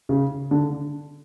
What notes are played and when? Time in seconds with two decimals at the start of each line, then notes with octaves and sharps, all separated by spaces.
0.09 C#3
0.51 D3